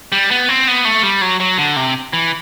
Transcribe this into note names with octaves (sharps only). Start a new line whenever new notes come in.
G3
B3
C4
B3
A3
G3
F#3
F#3
D3
C3
E3